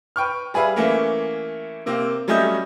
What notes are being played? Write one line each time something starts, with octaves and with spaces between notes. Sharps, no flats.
B4 G5 C#6 F6
G3 G#4 B4 E5 F5
E3 A3 A#3 C#4
C3 A#3 C4
F#3 G3 A3 C#4 D#5 G6